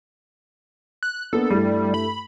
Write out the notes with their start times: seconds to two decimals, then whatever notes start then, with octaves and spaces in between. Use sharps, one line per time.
1.03 F#6
1.33 A#3 B3 D4 A4
1.50 G2 G3 A3 E4
1.94 B5